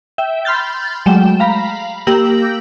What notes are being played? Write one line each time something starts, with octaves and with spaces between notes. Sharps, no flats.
E5 G5
B5 C6 F6 G6 A6
F#3 G#3 A3 G5 E7
F5 A#5 B5
A#3 G4 E6 G6 A#6 F#7